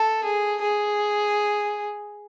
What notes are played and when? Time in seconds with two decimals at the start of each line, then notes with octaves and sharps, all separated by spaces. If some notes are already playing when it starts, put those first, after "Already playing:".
Already playing: A4
0.24 G#4
0.62 G#4